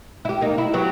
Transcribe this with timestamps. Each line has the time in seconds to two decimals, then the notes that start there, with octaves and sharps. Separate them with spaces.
0.25 E4 G4
0.41 A#3 D#4
0.58 E4
0.74 F#3 B3 G4